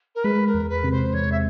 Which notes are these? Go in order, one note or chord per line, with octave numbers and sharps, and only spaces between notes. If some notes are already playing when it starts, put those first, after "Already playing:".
A#4
G#3 B4
A#4
E2
B4
C3
C5
E2 C#5
E5